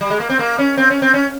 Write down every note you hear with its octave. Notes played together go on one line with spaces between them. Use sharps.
G3
G#3
A#3
C4
A#3
C#4
C4
C#4
C4
C#4